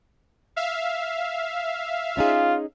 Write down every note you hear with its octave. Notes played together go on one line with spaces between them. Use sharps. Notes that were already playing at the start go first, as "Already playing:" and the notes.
E5 F5
C#4 D#4 F4 G#4